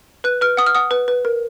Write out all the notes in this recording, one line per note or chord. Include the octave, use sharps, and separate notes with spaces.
B4 F#6
B4 F6
F#5 D#6
F6
F#5 D#6
B4
B4
A#4